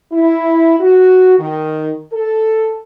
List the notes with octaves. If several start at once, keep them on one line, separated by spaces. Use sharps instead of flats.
E4
F#4
D#3
A4